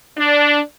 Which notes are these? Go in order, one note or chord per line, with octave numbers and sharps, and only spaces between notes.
D4